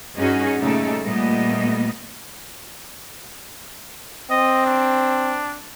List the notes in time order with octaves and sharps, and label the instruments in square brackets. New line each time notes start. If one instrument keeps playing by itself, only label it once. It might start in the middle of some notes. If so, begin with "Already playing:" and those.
[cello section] G2 C#4 D#4 F#4 G#4
A#2 C#3 G3 A3 D#4 A4
A#2 G3 A3 B3 D#5
[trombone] C4 [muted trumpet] D#5
[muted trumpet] D4